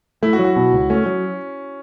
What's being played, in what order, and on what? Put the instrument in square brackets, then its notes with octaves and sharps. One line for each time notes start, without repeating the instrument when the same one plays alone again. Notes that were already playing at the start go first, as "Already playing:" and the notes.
[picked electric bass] A3 [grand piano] E4
[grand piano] F#4
[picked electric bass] F#3
[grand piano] F#4
[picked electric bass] B2
C#2
[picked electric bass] A3 [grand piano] C#4
[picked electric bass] F#3